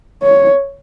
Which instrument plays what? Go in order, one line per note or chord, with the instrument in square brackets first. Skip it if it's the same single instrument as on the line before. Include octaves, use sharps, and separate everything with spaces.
[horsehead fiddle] C#5